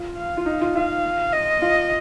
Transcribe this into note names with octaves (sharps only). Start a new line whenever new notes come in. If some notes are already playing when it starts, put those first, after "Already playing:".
Already playing: F4
F5
F4
D#4
F4
F4 F5
D#5
F4